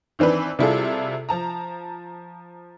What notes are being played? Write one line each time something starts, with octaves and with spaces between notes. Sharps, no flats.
D#3 E3 C4 D4 B4
C3 G3 E4 F4 G#4 A4
F3 A5 A#5